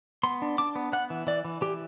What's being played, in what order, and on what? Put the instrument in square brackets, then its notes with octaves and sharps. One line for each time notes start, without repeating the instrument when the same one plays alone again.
[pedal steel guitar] B3 C6
D4
D4 D6
B3
B3 F#5
E3
E3 D5
E3
E3 G4